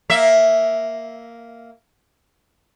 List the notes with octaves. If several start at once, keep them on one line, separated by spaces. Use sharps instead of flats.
A#3 E5